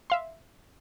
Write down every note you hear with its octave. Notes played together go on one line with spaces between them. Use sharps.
E5 F5 C6